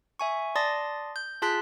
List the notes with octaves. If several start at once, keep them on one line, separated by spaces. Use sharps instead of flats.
E5 G#5 C#6
D5 A5 C6 D#6 A6 A#6
G6
F4 G#4 A5 C6 F#6 B6